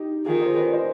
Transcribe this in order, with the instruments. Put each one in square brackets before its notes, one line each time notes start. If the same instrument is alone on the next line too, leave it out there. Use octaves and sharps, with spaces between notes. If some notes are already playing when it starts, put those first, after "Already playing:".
Already playing: [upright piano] D#4 G4
[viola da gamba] D#3 [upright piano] F4 G#4
[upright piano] G#4 C5
B4 D5
C5 D#5